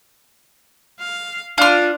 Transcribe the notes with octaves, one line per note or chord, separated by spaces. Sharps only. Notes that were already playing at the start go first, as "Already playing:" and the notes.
F5
D4 F4 F6